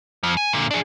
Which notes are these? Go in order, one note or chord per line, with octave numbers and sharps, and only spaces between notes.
F2 F3
G#5
A#2 D3
D4 G#4